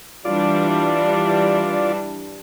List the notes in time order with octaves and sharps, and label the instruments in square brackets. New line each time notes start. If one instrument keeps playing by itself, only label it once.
[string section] E3 G3 D4 [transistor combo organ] F4 D5